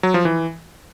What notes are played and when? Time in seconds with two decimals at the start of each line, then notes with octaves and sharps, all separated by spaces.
0.03 F#3
0.14 F3
0.25 E3